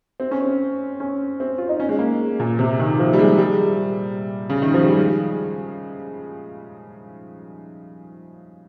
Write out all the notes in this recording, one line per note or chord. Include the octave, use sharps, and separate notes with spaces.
C4
C#4
C4
C#4
C4
F4
D#4
C#4
G#3
A#3
A#2
C3
D#3
F3
G3
G#3
G3
C#3
D#3
F3
G3
G#3